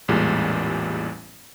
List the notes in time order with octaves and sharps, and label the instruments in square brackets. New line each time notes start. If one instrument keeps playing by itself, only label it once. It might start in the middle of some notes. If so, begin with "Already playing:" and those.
[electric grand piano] A1 E2 A#2 G3 G#3